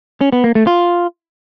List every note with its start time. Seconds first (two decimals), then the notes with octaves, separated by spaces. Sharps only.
0.21 C#4
0.32 B3
0.44 A#3
0.55 A3
0.67 F4